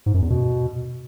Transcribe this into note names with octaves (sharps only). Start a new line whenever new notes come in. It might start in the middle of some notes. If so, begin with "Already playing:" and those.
G#2
F#2
E2
B2